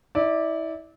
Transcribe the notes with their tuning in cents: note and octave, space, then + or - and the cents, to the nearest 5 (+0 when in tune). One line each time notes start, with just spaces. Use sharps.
E4 -30 D5 +0